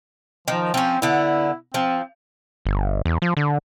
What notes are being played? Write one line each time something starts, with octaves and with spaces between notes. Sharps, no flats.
D#3 F3
F3 C4 C#4
D3 B3 E4
F3 C4
G1
E2
F3
D3